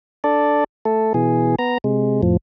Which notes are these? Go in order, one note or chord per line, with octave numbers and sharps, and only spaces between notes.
D4 A4 D5
A3 A4
B2 E3 G#4
B3 A#5
C3 G#3
F2 A2 F3